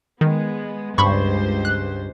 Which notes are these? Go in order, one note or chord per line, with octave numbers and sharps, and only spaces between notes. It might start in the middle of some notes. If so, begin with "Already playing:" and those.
D#3 G#3 B3
C#2 G2 C5 B5 C#6
F#6